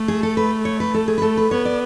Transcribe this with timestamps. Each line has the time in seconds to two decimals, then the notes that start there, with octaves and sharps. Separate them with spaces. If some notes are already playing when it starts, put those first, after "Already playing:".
Already playing: A3
0.08 G#4
0.23 A4
0.37 B4
0.65 C#5
0.80 B4
0.94 A4
1.08 G#4
1.18 B4
1.22 A3 A4
1.37 B4
1.51 B3 C#5
1.65 D5